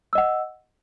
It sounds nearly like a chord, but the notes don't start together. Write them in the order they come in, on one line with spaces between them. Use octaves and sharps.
E6 D#5 F#5